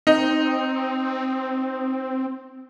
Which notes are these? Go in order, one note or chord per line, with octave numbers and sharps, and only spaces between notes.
C4 D#4